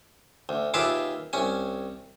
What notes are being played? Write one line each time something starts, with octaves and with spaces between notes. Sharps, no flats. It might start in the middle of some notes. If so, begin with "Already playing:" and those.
D2
D#2 F4 G#4 B4 E5 D6
C2 C#4 G#5